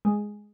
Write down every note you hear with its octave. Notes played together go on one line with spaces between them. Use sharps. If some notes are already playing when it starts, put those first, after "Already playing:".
G#3